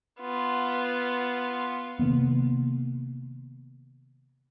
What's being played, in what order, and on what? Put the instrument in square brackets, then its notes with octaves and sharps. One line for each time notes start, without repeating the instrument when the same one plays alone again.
[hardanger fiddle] B3 F4
[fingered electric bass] C3 D#3 A#3 B3